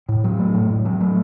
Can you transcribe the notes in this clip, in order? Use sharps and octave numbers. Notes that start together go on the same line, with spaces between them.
A2
F#3
A3
A2
A2
F#3
A3